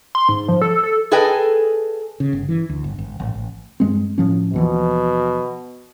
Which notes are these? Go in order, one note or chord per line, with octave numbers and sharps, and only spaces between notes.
C6
G#2
F3
A4
A4
G#4 A4 B4 D#5 G5 G#5
C#3
G1
E3
D2
G1
G#1
A1
A1
G2 G#3 C4
A2 F3 C#4
D#2 B2 E3 F3